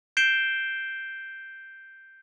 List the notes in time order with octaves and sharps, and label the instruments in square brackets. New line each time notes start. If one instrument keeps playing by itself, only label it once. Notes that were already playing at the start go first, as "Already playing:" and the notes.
[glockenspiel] G6 C7 D7 E7 G7